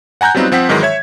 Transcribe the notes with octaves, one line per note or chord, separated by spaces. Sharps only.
F#5 G#5 A#5 F#6 G6
F#3 G3 B3 C4 D#4 F4
F3 C4 F#5 B6
G#2 D#3 E3 F#3 G#3
C#5 E5 G#6